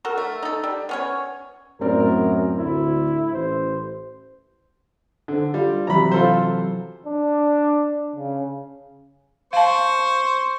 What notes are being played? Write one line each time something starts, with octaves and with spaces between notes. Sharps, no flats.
F#4 A4 A#4
A3
D#4 A4
G3
B3 C#4 C#5
F#2 A2 C4 A#4 D5
D2 E4
A1 C5
D3 A4 C5
G3 F4
C3 E3 F#3 A#5 B5
F4 A4 C5
D4
C#3
C5 F5 A5 C#6